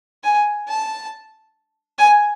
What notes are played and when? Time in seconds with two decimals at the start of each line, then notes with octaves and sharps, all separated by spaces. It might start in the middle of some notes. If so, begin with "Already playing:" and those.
0.24 G#5
0.68 A5
1.98 G#5